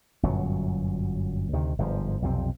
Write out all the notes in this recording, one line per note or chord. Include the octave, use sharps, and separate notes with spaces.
G1 F#2 A#2 F#3
D2 C3 D#3
G1 G#2 C#3 F3
B1 F2 C3 C4